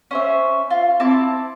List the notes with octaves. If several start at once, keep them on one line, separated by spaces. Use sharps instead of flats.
C#4 C5 E5
F4
C4 E4 A5 D6